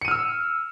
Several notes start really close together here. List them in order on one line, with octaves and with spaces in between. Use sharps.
C#7 D#7 F6 E6